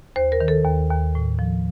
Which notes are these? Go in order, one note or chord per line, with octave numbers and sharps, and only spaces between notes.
D#2 C5
A#4
D#3
A4
D#2
D#2
A2
F3